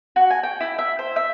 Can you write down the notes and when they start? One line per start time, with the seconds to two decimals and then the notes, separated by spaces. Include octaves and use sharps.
0.16 F#4
0.30 G#5
0.43 G5
0.60 E4
0.78 E5
0.99 C5
1.16 E5